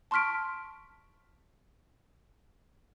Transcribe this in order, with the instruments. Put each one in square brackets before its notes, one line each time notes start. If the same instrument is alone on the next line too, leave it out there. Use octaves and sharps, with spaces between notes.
[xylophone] A5 C6 C#6 F6 B6 D7